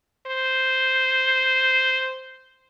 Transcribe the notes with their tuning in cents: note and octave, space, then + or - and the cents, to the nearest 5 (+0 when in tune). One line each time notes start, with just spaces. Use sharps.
C5 -5